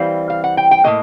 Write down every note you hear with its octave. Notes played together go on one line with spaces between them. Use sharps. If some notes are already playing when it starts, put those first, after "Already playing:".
Already playing: E3 G3 C4 F5
F5
F#5
G5
G5
A2 F#3 A#3 D#5